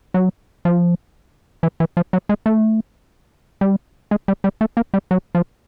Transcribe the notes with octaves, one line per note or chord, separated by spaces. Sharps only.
F#3
F3
E3
E3
F3
F#3
G#3
A3
G3
G#3
G3
G3
A3
A#3
G3
F#3
F3